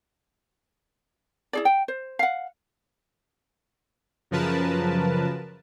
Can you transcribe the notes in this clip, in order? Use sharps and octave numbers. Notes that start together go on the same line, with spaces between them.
E4 G#4 D5
G5
C5
F5 F#5
F#2 C#3 F3 A#4 B4 A5